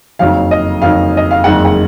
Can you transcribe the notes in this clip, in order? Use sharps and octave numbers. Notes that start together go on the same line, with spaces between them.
F#1 F2 D#3 F#3 F5
D#5
F#1 F2 D#3 F#3 F5
D#5
F5
F#1 F2 D#3 G#3 F#5
F#5